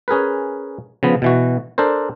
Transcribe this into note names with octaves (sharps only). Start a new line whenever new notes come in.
C#4 G#4 A#4 B4
C#3 F3 B3
B2 E3 F#4
D4 A4 A#4 C5